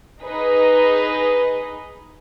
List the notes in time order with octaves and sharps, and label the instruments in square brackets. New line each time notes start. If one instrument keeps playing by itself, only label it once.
[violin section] D#4 G#4 B4 D#5